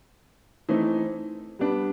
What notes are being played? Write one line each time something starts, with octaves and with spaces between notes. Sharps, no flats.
E3 A3 C4 D#4
G3 B3 D4